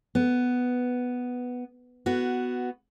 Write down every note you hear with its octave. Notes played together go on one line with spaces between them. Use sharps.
B3
B3 F#4